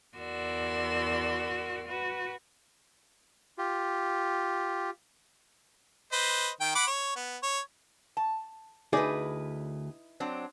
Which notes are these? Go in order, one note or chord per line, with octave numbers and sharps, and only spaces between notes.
E2 F#4 A#4 D5 C6 E6
F#4 B4
F4 G4
B4 C5 D#5
D#3 G5
F#5 B5 D6
C#5
B3
C#5
A5
D2 D#4 E4 G#4 B4 D5
F#3 C4 D4